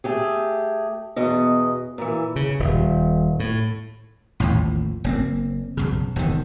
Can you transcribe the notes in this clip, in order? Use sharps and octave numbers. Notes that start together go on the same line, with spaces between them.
A3 G4 G#4
E2 B2 D#5
A#2 E3
C#3
D#1
A2
A1 D#2 A2 F3
F#1 A#3 C4
B1 F#2 C#3
E1 C3 D#3